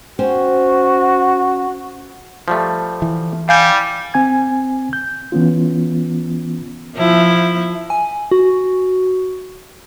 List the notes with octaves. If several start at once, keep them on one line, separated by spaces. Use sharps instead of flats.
C#4 F#4 C5 G5
F3 G3 A3
E3
G3 F5 G#5 G6
C4 G#5 G#6
G6
E3 B3 C#4 F4
F3 E4
G#5
F#4